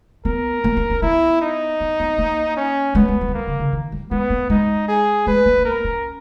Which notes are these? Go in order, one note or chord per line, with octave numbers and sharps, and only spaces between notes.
B3 A#4
A#3
B3
C#4
B3 E4
D#4
B3
B3
A#3
C#4
G#3 B3
G#3
G3
E3
D#3 A#3
C#3
C#3
D#3
G3
G#3 B3
A#3
G#3 D#4
G#4
G#3 B4
A#3
C#4
B3 A#4
C#4